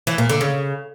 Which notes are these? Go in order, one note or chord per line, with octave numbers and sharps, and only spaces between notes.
E3
A#2
D3
C#3